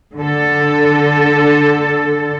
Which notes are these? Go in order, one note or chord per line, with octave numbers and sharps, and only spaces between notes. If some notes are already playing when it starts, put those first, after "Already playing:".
D3 A4